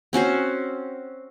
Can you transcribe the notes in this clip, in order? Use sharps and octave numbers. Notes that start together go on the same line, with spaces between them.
C4 C#4 F#4 C5